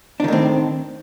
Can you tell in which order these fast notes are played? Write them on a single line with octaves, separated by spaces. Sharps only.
D4 D#3 A2 C4